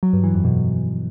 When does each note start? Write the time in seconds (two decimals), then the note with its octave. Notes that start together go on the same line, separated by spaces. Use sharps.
0.03 F#3
0.13 G2
0.24 E3
0.34 F2
0.45 B2